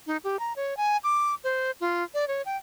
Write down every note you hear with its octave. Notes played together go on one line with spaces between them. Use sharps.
D#4
G4
A#5
C#5
G#5
D6
C5
F4
D5
C#5
G5